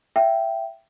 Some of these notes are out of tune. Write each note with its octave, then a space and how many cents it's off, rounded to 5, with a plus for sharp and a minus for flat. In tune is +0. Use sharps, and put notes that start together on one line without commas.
E5 +20 G5 -5